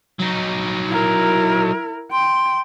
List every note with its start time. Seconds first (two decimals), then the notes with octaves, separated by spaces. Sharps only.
0.19 F#3 D#4
0.89 E4 A#4
2.12 G5 C6